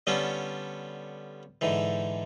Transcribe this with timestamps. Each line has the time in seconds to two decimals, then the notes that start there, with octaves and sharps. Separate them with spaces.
0.07 D3 G3 B3 C#4 F4 A4
1.61 G#2 D3 E3